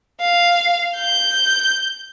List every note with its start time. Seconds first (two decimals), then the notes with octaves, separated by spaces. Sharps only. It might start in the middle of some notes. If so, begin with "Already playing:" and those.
0.20 F5
0.97 G6